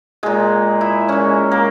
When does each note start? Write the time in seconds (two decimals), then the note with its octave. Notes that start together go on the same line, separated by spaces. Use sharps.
0.23 A#2 G#3 G#4
0.81 E4
1.08 A#2 G#3 C#4
1.52 A#3